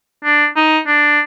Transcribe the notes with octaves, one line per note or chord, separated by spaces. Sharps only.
D4
D#4
D4